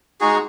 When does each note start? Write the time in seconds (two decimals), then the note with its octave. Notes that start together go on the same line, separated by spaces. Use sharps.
0.21 G#3 D#4 F#4 G#4